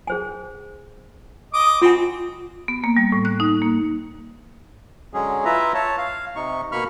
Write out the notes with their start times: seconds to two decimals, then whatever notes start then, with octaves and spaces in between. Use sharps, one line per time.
0.07 G#4 C5 G#5
1.53 D#5 D6 D#6
1.82 C4 F4 F#4 G#5
2.68 B3
2.84 A#3
2.97 G3
3.12 A2
3.25 F#6
3.40 D#4
3.62 A#3
5.14 D3 F#3 G#3 C#4 G#4
5.45 E4 F4 B4 E5 A#5
5.74 C#5 A5
5.98 F5
6.36 C3 D#4 C#6
6.72 B2 A#3 B5 C#6 F6